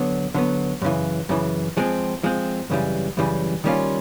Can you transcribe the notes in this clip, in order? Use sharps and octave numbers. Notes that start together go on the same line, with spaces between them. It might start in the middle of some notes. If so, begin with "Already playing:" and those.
Already playing: D3 F#3 B3
D3 F#3 B3
F#2 C#3 E3
F#2 C#3 E3
F3 G#3 C4
F3 G#3 C4
F#2 C#3 E3 G3
F#2 C#3 E3 G3
D#3 G3 A#3 C#4 F4